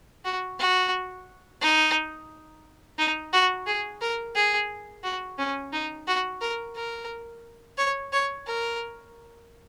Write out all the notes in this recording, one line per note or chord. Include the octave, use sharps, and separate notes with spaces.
F#4
F#4
D#4
D#4
F#4
G#4
A#4
G#4
F#4
C#4
D#4
F#4
A#4
A#4
C#5
C#5
A#4